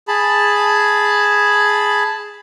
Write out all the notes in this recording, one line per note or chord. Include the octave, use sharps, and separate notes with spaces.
G#4 A5 B5